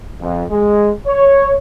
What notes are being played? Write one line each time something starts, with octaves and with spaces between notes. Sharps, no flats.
F2
G#3
C#5